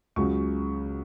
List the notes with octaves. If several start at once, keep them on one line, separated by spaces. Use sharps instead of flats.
C#2 C#3 F#3 C#6